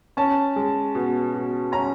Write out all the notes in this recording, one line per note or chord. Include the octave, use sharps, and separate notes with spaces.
C#4 A5
G#3
B2
B2
C#4 A#5